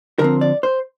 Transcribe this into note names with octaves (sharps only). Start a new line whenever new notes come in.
D3 F3 C4 A#4
D5
C5